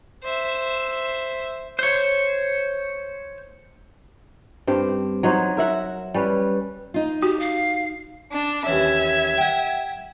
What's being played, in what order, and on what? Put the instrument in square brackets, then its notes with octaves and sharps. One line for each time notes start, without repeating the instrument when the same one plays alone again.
[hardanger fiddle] C5 E5
[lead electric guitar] C5 C#5
[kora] G2 C4 G4
F#3 D#4 C5 C#5
A#4 E5 F#5
G3 C#4 B4
[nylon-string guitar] D#4 F4
[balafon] F#4 [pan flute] G4
[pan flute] F5
[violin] D4
[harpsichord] D#2 E3 C#4 [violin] E5 G#6
[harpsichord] F#5 G5